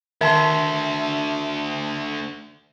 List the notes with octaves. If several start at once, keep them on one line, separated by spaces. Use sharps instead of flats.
D2 D#3 E5 A5 C6